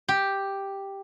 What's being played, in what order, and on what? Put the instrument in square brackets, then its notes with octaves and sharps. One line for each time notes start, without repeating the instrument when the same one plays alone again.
[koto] G4